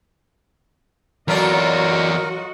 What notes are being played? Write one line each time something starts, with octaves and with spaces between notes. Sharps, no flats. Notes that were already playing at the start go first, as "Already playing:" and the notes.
E3 F#3 F4 F#4 A4 A#4 D5 D#5